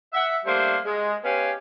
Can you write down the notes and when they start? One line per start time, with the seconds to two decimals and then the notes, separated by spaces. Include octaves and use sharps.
0.13 E5 F#5
0.46 G3 A3 A#3 D4 C5
0.85 G#3
1.23 B3 C#4 G4 F5 G#5